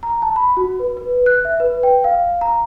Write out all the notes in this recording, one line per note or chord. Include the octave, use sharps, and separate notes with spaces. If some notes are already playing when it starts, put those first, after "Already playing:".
A#5
A5
B5
F#4
B4
B4
F#6
E5
B4
G5
F5
A#5